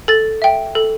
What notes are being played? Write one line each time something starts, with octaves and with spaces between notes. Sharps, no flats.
A4 A6
E5 G5
A4